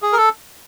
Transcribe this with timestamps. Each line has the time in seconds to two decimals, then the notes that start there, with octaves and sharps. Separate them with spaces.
0.02 G#4
0.13 A#4
0.17 A4